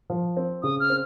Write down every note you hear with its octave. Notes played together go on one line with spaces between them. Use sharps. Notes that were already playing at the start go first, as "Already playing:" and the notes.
F3
C4
C#3 D#6
F6
C4